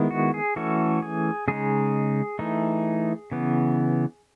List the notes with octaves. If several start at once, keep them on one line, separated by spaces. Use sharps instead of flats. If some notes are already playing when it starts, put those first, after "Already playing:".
Already playing: D#3 G#3 B3 E4
F#4
G#4
E3 A3 C#4 F#4 A4
G#4
C#3 G#3 D#4 G#4
E3 A3 D#4
C#3 E3 B3